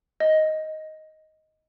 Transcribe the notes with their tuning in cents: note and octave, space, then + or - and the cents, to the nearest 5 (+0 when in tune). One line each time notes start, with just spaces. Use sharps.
D#5 +5